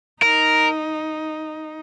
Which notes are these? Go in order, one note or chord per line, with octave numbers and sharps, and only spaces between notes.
D#4 A#4